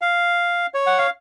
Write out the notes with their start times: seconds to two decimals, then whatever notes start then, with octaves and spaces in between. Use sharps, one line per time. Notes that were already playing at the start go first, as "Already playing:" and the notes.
0.01 F5
0.74 C#5
0.86 F#5
0.98 F5